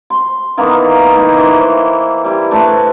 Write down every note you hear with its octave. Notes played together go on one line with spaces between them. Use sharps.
C6
D#3 E3 A#3 B3
D#3 A#3 D#4 E4
E3 C5
G3 E4
A3 D4 B4 C5